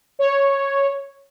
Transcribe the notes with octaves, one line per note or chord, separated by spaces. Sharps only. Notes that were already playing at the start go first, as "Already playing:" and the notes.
C#5